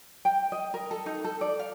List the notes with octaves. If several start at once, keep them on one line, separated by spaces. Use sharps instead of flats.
G5
D#5
A#4
A4
D#4
A4
D5
F5